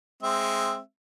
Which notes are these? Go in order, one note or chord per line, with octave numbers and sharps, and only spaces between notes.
G#3 C4 E5